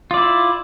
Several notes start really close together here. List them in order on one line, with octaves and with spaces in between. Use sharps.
F4 D5 E4